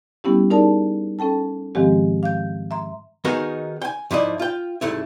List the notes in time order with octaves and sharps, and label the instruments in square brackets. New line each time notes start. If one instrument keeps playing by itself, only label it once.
[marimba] G3 B3 C#4 E4 G4
D#4 G#4 A#4 D5 A5
C#4 A4 G5 A5
G#2 D#3 F3 G#3 C4 G4
F5 G6
E5 A#5 C6
[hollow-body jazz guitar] D#3 B3 D#4 F#4 G#4 A#4
G5 G#5
G#2 F3 E4 D5 D#5
F4 G5
C2 G#2 A3 E4